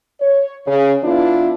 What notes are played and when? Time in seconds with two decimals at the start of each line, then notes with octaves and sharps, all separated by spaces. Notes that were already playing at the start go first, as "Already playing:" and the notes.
0.20 C#5
0.66 C#3
1.04 E3 B3 D4 E4 F4